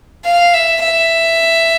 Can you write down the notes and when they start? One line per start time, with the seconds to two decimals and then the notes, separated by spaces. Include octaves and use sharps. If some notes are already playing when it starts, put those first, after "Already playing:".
0.25 F5
0.54 E5
0.82 E5